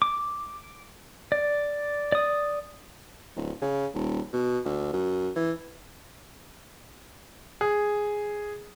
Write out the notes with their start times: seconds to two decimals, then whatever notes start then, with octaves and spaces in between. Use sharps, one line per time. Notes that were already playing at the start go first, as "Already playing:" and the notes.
0.02 D6
1.32 D5
2.12 D5 D#6
3.36 D1
3.61 C#3
3.94 D#1
4.33 B2
4.65 D2
4.93 F#2
5.36 E3
7.61 G#4